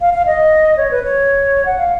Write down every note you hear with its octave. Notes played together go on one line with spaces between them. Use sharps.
F5
F5
D#5
C#5
B4
C#5
F#5
F5